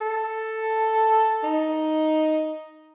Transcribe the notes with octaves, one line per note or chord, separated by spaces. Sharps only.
A4
D#4